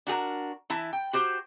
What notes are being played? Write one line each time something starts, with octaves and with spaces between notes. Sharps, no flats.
D4 F#4 G#4 A#4
E3 E4 A5
G5
F#4 G4 C5